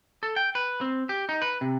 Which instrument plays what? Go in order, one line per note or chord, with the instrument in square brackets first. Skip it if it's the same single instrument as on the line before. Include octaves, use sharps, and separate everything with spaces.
[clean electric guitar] A4
G5
B4
C4
G4
D#4
B4
C3